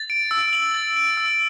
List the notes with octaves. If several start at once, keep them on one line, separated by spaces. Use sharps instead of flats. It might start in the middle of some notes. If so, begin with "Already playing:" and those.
Already playing: A6
D7
E6
F#7
A6
D7
E6